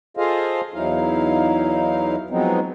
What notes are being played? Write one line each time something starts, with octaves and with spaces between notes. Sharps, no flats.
F4 G#4 A4 C5 D#5 F5
E2 F#3 D#4 E4 F5
F3 F#3 G#3 B3 C4 D#4